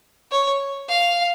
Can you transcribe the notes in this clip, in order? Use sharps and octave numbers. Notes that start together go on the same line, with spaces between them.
C#5
F5